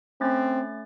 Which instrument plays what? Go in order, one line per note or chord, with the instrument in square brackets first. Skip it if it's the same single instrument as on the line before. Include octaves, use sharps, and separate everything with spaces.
[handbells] A3 C#4 A6 [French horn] C4